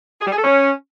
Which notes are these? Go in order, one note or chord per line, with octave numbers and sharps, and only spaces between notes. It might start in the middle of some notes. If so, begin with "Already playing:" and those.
G#4
G3
G#4
A4
C#4